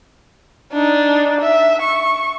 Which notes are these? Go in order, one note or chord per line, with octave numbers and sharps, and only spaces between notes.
D4 D#4
E5
C#6